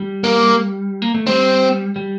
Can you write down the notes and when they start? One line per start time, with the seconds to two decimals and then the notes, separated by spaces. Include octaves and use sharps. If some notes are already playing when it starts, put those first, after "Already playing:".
Already playing: G3
0.24 A#3
1.02 A#3
1.14 A3
1.27 G3 C4
1.96 G3